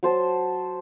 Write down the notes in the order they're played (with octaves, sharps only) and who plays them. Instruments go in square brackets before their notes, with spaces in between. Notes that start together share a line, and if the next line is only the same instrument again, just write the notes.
[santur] F#3 C5 A5